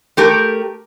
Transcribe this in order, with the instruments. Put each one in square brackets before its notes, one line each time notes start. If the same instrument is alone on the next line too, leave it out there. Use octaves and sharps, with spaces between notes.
[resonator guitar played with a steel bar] A3 G4 A#4